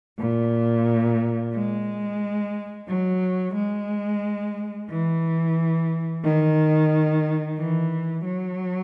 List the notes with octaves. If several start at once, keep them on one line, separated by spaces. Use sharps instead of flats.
A#2
G#3
F#3
G#3
E3
D#3
E3
F#3